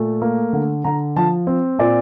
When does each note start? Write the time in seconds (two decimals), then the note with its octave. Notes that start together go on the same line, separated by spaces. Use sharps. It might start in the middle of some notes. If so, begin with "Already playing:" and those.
Already playing: A#2 A3
0.22 A#3
0.53 D3
0.84 D3 A#5
1.16 F3 A5
1.47 C4
1.79 A#2 D5